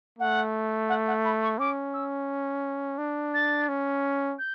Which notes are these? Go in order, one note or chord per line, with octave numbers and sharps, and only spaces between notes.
A3 F#5
F#5
F#5
B5
C#6
C#4 D6
E6
D4
A6
C#4
G6